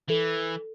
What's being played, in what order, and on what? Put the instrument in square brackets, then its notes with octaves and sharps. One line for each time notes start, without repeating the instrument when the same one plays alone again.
[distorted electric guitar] E3 [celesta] A4